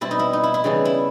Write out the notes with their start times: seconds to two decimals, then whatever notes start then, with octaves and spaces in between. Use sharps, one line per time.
0.01 B2 G3 C4 E4
0.11 D#4
0.19 E4
0.33 D#4
0.44 E4
0.54 E4
0.64 C#3 E3 G3 B3 D#4
0.85 E4